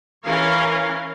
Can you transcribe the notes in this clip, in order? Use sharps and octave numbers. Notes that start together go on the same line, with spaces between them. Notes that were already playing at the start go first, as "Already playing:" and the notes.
E3 C#4 A#4 C#5 F5